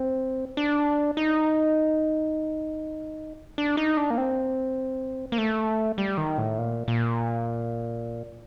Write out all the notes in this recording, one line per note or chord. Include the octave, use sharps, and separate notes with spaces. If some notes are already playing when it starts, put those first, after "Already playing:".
Already playing: C4
D4
D#4
D4
D#4
D4
A#3
C4
A#3
A3
G3
D#3
A2
A#2
A#2